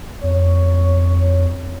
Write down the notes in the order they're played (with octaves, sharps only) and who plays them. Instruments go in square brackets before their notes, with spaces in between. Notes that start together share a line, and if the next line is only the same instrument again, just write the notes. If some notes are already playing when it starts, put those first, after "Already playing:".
[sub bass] F2 [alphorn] C#5